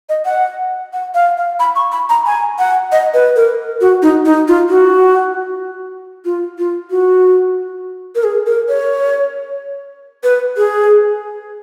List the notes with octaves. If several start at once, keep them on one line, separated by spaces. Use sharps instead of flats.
D#5
F#5
F#5
F5
F5
B5
C#6
B5
A#5
G#5
F#5
D#5
B4
A#4
F#4
D#4
D#4
F4
F#4
F4
F4
F#4
A#4
G#4
A#4
C#5
B4
G#4